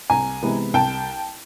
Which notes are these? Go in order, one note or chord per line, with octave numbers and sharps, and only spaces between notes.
C2 G#5 A#5
C3 E3 G#3 B3
C2 G5 A5